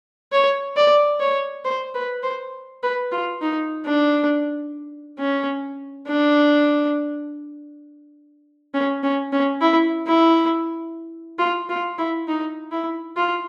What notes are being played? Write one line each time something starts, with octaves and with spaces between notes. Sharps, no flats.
C#5
D5
C#5
C5
B4
C5
B4
F4
D#4
D4
C#4
D4
C#4
C#4
C#4
E4
E4
F4
F4
E4
D#4
E4
F4